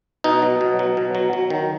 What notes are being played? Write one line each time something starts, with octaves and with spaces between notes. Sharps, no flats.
B2 D#4
F#3
B2
F#3
B2
F#3
F#3
D#3